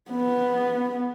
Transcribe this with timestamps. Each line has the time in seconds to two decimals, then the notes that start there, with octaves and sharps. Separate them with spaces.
0.10 B3